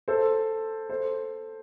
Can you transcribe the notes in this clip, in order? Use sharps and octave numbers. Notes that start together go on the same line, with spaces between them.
A4 C5
A4 C5